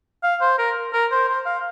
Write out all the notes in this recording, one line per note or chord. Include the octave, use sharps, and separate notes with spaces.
F5
C5
A#4
A#4
C5
C5
F5